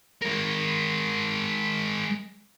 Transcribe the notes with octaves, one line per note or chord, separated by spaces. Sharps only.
G#3 A#4